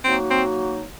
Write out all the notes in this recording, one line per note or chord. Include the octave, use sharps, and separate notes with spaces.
F#3 A#3 C4 D#4 F#4
C4